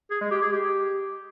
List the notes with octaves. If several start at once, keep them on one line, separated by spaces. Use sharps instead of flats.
G#4
G#3
G4
G#4
G4